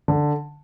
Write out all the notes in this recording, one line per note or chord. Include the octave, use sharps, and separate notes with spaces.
D3